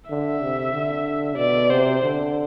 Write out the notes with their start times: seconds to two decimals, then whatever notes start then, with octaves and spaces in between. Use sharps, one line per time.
0.10 D3 E5
0.42 C3
0.74 D3
1.37 B2 D5
1.70 C3 C5
2.02 D3